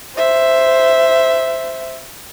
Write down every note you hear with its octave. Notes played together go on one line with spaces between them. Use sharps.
C5 E5